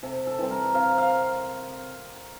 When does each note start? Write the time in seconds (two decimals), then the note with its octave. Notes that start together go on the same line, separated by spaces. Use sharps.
0.03 C3 A4
0.27 A4
0.38 E3 G3 C4
0.51 A#4
0.74 C3 F5
0.98 F5